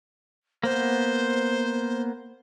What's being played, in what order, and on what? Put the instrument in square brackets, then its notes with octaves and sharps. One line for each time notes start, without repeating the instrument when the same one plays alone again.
[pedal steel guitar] A#3 B3 [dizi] C5